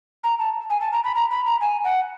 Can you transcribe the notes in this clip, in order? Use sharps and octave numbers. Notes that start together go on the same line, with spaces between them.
A#5
A5
G#5
A5
A#5
B5
A#5
B5
A#5
G#5
F#5